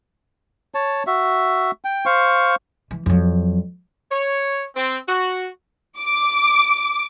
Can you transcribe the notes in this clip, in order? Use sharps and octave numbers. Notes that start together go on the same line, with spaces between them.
C#5 A5
F#4 E5
G5
C5 F5 C#6
E3
F2 F#3
C#5
C4
F#4
D6